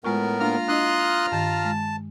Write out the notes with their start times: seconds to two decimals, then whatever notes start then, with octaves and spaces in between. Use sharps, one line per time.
0.04 A2 G#3 B3 F4 A#4 C#6
0.40 A#3 D4 F4 A#5 F6
0.68 D4 E4 D#5 C6 D#6 F#6
1.32 G2 D#3 A5
1.65 G#3